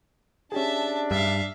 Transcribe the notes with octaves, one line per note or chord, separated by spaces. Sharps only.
C#4 D4 G4 G#4 E5 A5
G2 E5 F5